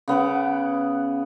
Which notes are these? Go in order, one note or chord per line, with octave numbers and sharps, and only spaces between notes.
C#3 B3 F#5 D6